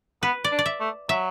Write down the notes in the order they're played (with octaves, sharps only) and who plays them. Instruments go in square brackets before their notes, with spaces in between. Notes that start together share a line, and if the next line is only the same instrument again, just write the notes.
[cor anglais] B3 [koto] B4
[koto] D5
[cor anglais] D4
[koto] D5
E5
[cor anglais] A3
[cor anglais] F#3 [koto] E5